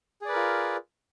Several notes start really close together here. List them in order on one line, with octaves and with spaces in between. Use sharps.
G#4 D5 B4 A#4 F4